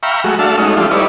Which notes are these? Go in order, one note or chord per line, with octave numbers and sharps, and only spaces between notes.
E5 F5 G5 A#5 B5 C#6
F#3 G#3 A3 F#4
A3 D4 F#4 E5 F5 A5
G#3 A3 C#4 D#4 F#4
F3 A3 D4 E4 F4 G4
G3 D#4 E4 B4 C#5 D5